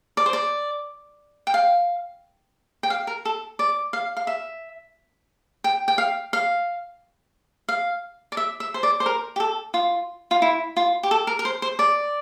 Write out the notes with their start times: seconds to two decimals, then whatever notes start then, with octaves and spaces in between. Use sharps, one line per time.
0.17 D5
0.26 C5
0.33 D5
1.47 G5
1.54 F5
2.83 G5
2.90 F5
3.07 A#4
3.25 A4
3.59 D5
3.93 F5
4.17 F5
4.27 E5
5.64 G5
5.88 G5
5.98 F5
6.33 F5
7.69 F5
8.32 D5
8.37 E5
8.60 E5
8.74 C5
8.83 D5
9.00 C5
9.06 A#4
9.36 G4
9.40 A4
9.74 F4
10.31 F4
10.42 E4
10.77 F4
11.03 G4
11.11 A4
11.27 A#4
11.39 A#4
11.45 C5
11.62 C5
11.79 D5